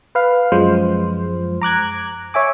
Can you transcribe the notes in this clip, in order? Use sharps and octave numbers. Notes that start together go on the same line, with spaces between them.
B4 F5
F#2 F3 G#3 C5
A#5 D6 F#6 G#6
C#5 E5 G#5 D6